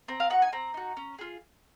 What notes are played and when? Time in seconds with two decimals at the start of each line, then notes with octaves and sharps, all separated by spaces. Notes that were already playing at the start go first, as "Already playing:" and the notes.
0.08 C4 A#5
0.20 F5
0.30 D#4 F#4 F#5
0.42 G#5
0.53 C4 A#5
0.74 D#4 F#4
0.97 C#4
1.19 F4 G#4